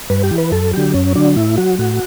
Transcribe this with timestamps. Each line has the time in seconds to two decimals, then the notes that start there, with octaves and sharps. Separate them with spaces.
0.10 G2 B4
0.23 G4
0.31 E3
0.38 B4
0.52 F#2 A4
0.73 D3 F#3 G4
0.94 F#2 C#4
1.15 D3 F#3 D4
1.36 A2 E4
1.57 F#3 F#4
1.79 A2 F#4